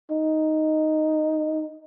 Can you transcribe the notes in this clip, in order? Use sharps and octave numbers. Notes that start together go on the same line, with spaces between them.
D#4